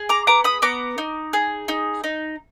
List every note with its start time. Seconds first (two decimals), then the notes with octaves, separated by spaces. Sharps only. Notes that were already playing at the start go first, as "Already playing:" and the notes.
Already playing: G#4
0.09 A#5 D6
0.27 B3 A#5 D6
0.44 B5 D#6
0.62 B3 A#5 D6
0.98 D#4
1.33 G#4
1.68 D#4
2.04 D#4